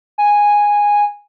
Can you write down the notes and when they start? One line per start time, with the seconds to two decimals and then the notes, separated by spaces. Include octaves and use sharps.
0.18 G#5